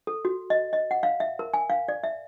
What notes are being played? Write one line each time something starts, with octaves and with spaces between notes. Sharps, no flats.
A4
F#4
D#5
D#5
F#5
F5
E5
A#4
G#5
F5
D5
E5